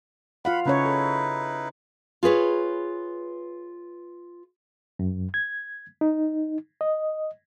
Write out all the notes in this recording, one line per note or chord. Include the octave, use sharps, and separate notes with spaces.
F4 F5 F#5 B5
C#3 C#4 D#4 E4 B4 C#5
A4
F4 G#4 B4 C#5
F#2
G#6
D#4
D#5